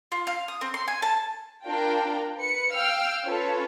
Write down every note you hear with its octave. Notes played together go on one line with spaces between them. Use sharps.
F4
F5
D#6
C4
C6
G#5
A5
D4 F4 A#4 G5
B4 C#7
F5 G5 E6 F6
C#4 F4 A4 B4 C#5